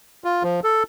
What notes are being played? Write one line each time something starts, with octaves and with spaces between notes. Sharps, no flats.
F4
F3
A4